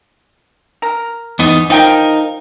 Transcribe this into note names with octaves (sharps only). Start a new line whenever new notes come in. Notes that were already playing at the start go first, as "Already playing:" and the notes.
A#4
E2 B3 D#4
F3 D#4 A#4 G5